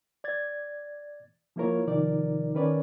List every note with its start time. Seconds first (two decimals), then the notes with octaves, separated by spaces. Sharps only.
0.24 D5 G#6 A6
1.56 F3 A#3 E4 F4 A#4 C#5
1.87 C3 D#3 F3 D#4 A#4 D5
2.54 D#3 C#4 A#4 B4 C#5 D5